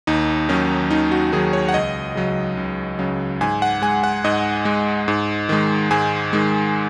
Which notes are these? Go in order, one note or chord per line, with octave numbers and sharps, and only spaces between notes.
D#2 D#4
D#3 F#3 C#4
D#2 D#4
F#4
D#3 F#3 G#4
C#5
F#5
C#2 D#5
C#3 F#3
C#2
C#3 F#3
G#2 G#5
F#5
G#3 G#5
F#5
G#2 D#5
G#3
G#2
D#3 G#3
G#2 G#5
D#3 G#3